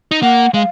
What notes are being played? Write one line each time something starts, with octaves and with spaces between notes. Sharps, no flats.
D#4
A#3 F#5
G#3 F5